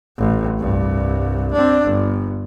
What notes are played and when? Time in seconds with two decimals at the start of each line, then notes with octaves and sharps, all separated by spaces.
0.18 A1
0.59 C2 G2
1.53 C4 D4
1.85 G1